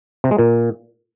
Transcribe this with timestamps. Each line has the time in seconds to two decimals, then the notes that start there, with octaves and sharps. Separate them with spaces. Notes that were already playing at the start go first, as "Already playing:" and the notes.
0.24 C3
0.31 G#3
0.39 A#2